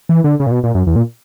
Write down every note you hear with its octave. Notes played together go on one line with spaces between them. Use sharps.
E3
D3
C#3
A#2
B2
A#2
F#2
E2
A#2